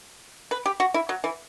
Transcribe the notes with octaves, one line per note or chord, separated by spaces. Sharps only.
B4
G4
F#4
E4
F#3
E3